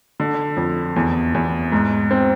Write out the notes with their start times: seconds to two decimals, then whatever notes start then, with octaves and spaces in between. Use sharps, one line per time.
0.20 D3
0.57 F2
0.96 E2
1.34 E2
1.72 G#2
2.11 C4